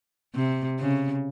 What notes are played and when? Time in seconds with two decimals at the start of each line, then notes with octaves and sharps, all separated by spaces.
0.35 C3
0.80 C#3